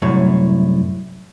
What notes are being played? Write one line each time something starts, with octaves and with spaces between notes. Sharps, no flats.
C2 F#2 A2 C#5